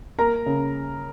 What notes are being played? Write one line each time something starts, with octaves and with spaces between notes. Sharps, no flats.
A#3 A#4 A#5
C#3